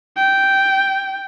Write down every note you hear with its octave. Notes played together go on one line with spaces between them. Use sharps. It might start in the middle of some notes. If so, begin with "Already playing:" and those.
G5